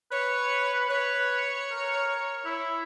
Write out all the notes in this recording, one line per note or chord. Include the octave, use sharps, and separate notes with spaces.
B4 C#5
B4 C#5
A#4
E4